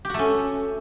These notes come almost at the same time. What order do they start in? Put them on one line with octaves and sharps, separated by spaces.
G4 F#4 A3 C#4